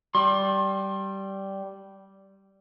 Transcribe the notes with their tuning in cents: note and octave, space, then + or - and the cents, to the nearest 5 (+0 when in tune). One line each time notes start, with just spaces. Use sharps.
G3 -10 C6 +35